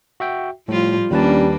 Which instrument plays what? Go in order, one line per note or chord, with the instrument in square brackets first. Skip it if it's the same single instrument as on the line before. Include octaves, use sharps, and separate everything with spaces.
[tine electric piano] F#4 E5 G5
[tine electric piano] A2 [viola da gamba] F3 F4 [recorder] G3
[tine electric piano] D#2 B4 A5 [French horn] G3 [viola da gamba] A#3 D4 [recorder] C#4